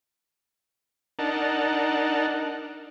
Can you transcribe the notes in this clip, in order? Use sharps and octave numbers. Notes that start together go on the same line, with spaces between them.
D4 D#4 A#4 F#5 A5